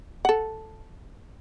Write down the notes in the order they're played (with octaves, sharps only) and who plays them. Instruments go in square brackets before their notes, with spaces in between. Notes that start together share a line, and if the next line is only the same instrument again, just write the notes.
[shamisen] A4 F#5